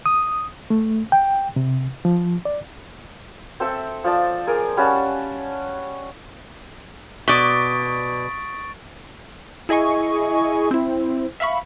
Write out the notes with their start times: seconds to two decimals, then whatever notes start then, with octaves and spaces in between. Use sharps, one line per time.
0.06 D#6
0.70 A3
1.12 G5
1.56 C3
2.05 F3
2.45 D5
3.60 C4 A4 E5 G5
4.04 F3 D5 A5
4.47 G#4 A#4 D5
4.77 G3 C#4 F#5 A5
7.28 B2 D5 C#6 D#6 A6 B6 D7
9.69 E4 G#4 D#5 G#5 C#6
10.71 C4 E4
11.40 E5 F5 B5 C#6